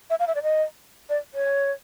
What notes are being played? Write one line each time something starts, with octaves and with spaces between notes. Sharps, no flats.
E5
F5
E5
D5
D#5
D5
C#5